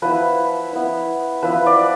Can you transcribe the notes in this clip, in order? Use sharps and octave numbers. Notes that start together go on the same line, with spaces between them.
F3 B3 E4 B4
B3 E4
F3 B3 E4 B4
D5